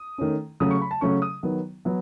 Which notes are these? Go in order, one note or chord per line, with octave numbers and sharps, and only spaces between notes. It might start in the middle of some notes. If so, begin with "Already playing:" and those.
Already playing: D#6
D#3 A3 C#4
C#3 F#3 A3 C#4 D#6
C#6
B5
A5
C#3 F#3 A3 C#4 C#6
D#6
D#3 F#3 B3
F#3 B3